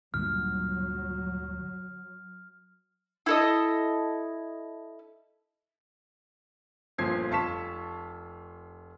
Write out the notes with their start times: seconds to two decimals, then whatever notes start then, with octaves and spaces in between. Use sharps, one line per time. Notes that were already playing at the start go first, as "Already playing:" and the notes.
0.14 D2 G2 A#2 F#3 F6
3.26 E4 A4 D#5
6.98 G1 A#2 F3 G#6 C7
7.30 F1 F4 A5 C#6 B6 E7